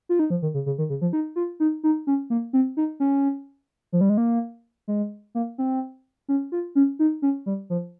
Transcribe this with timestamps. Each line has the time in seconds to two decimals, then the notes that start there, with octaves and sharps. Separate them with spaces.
0.09 F4
0.19 D#4
0.30 F3
0.42 D#3
0.54 C#3
0.66 C#3
0.78 D#3
0.90 C#3
1.01 F3
1.13 D#4
1.36 F4
1.60 D#4
1.84 D#4
2.07 C#4
2.30 A#3
2.53 C4
2.77 D#4
3.00 C#4
3.92 F3
4.01 G3
4.09 G#3
4.17 A#3
4.88 G#3
5.35 A#3
5.58 C4
6.29 C#4
6.52 F4
6.75 C#4
6.99 D#4
7.22 C#4
7.46 G3
7.70 F3